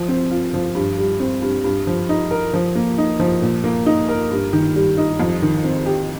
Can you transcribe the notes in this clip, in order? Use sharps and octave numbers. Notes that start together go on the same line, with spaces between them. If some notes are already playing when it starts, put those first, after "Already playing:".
Already playing: F3
C4
F4
F3
G2
G3
C4
G2
G2
F3
D#4
A#4
F3
A#3
D#4
F3
A#2
A#3
D#4
A#4
G2
D#3
G3
D#4
F2
D#3
C4
G4